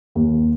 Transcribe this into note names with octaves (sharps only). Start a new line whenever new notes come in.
D#2